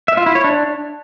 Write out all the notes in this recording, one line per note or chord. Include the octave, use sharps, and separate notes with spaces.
E5
F4
E4
C#5
D4